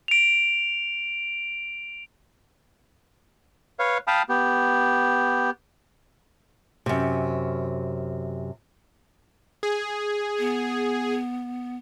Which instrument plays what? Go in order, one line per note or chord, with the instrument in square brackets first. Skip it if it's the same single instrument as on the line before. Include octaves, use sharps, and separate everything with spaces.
[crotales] D7 F7
[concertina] B4 C#5 F5
F5 G5 A5 B5 D#6 F6
B3 G4
[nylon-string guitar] F#2 C3
[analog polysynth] G#4
[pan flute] B3